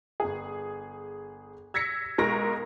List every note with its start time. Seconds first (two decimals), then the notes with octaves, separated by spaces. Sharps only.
0.20 G1 G#4
1.74 E6 G#6 A#6 B6 C#7
2.18 B1 G#3 A#4 C#6 A#6